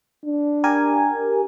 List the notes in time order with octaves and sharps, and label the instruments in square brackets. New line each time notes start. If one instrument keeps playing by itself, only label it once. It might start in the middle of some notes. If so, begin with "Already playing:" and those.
[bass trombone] D4
[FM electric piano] G4 A#4 G#5